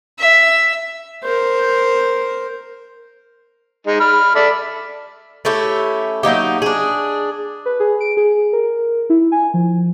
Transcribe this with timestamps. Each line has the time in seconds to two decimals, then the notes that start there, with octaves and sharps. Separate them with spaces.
0.19 E5
1.24 A#4 C5
3.87 G#3 D#4
4.00 B5 F6
4.35 A4 D5 E5
5.45 A3 C#4 E4 G4
6.23 F#3 A#3 D#4 G4
6.62 D4 G#4
7.66 B4
7.80 G#4
8.00 D7
8.17 G#4
8.53 A#4
9.10 E4
9.32 G#5
9.54 F3